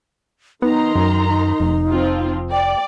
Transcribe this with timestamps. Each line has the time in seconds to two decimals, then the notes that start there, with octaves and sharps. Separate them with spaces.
0.62 D#3 B3 D#4 A#5 C6
0.95 F#2
1.28 D#4
1.60 F1
1.89 F3 C4 F4
2.52 D5 G5